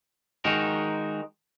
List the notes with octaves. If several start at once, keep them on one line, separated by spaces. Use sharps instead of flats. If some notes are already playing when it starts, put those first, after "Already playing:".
D#3 G#3 D#4 F#4 A#4